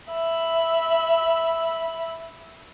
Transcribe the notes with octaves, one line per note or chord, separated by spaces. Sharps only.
E5 B5